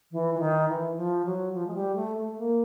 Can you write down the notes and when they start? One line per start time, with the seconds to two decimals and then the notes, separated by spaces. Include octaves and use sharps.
0.12 E3
0.35 E3
0.40 D#3
0.69 E3
0.96 F3
1.25 F#3
1.53 F3
1.67 G#3
1.75 G3
1.95 A3
2.17 A3
2.38 A#3